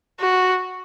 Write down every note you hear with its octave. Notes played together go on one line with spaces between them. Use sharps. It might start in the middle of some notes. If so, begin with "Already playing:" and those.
F#4